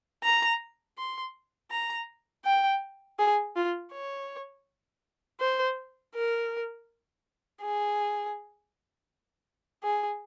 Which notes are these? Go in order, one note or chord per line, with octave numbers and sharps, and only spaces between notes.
A#5
C6
A#5
G5
G#4
F4
C#5
C5
A#4
G#4
G#4